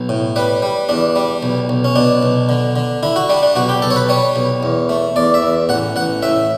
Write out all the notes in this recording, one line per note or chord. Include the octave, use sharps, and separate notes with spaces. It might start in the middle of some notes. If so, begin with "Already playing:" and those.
Already playing: B1
A2
G3 B4
G3
E2 D4
G3
B1
B1
C#4
B2 D4
B1
D3
D3
D3 E4
F#4
G3 D4
D4
B1 F#4
G4
B1 A4
C#5
B4
G3 C#5
B1
E2
A3
E2 D5
E5
E2
A1 F#5
A1 F#5
A2 E5